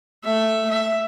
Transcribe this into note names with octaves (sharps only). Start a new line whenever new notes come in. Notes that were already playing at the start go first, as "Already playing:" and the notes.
A3 E5
E5